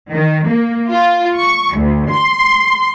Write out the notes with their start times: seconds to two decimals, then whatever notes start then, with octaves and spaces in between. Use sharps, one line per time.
0.12 D#3
0.46 A#3
0.90 F4
1.38 C#6
1.77 D2
2.11 C6